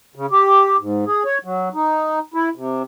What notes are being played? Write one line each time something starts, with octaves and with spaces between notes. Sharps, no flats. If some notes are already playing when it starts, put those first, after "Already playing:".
C#3
G4
G#2
G#4
C#5
F#3
D#4
E4
C3